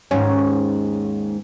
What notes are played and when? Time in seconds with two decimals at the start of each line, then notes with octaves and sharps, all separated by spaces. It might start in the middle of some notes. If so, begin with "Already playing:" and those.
0.11 D#2 G#2 C#4